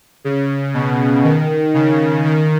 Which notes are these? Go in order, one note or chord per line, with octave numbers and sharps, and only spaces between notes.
C#3
B2
D#3
C#3
D#3